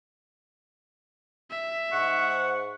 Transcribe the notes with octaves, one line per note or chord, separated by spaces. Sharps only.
E5
G#2 F#5 C#6